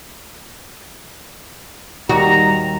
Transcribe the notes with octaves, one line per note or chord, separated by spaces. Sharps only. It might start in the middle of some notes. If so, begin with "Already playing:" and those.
D#2 G3 F#4 A#5